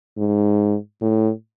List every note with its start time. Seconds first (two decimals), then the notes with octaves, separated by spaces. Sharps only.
0.18 G#2
1.02 A2